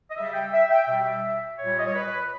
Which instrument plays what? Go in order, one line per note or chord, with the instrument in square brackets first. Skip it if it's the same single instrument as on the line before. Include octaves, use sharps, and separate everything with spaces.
[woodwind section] D#5
C#3 G3 E5
G5
E5
G5
B2 G3 E5
A#2 G3 C#5
D#5
C#5
B4